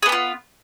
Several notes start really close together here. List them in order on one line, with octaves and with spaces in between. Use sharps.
G#4 B3 G4 F4